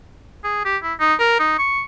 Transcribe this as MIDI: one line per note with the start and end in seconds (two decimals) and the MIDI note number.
0.44 0.63 68
0.65 0.77 67
0.83 0.94 64
1.00 1.14 63
1.19 1.37 70
1.39 1.54 63
1.58 1.82 85